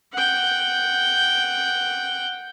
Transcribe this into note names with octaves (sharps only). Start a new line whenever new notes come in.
F#5 G5